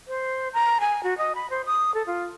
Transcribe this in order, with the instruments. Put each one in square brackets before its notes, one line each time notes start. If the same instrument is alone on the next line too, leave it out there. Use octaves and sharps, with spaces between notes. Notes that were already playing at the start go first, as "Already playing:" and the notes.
[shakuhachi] C5
A#5
G#5
F#4
D#5
B5
C5
D#6
A4
F4